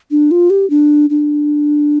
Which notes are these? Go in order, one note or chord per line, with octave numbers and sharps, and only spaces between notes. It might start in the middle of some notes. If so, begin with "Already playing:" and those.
D4
F4
G4
D4
D4